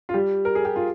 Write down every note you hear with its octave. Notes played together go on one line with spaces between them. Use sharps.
F4
G3 G4
A#4
G#4
G4
F4